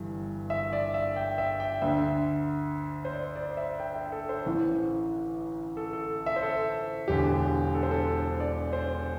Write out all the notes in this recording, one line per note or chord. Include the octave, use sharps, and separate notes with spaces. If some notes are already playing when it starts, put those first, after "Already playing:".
Already playing: G1 G2 E3
E5
D5
E5
G5
E5
G5
D2 D3 E5
C5
D5
D5
E5
G5
E5
A4
C5
A1 A2 E3
A4
A4
E5
C5
A4
E1 E2 D3 G4
A4
C5
A4
D5
C5